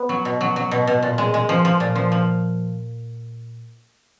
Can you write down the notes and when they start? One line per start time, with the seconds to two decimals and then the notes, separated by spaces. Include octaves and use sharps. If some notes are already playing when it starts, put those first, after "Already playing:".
Already playing: B3
0.09 F#3
0.25 B2
0.41 F#3
0.56 F#3
0.71 B2
0.87 B2
1.02 A#2
1.18 G#3
1.34 G#3
1.49 F3
1.65 F3
1.80 A#2
1.95 F3
2.12 F3